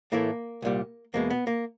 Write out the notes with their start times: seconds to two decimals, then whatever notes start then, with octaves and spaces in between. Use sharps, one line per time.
0.12 A2 E3 A3 A#3
0.62 C2 A#2 G3
1.14 E2 B2 G#3 A#3
1.30 B3
1.47 A#3